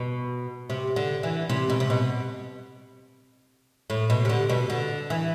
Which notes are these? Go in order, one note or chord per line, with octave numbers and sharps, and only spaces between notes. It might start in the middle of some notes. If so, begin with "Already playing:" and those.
Already playing: B2
C3
D3
E3
C3
B2
C3
B2
A2
B2
C3
D3
B2
D3
E3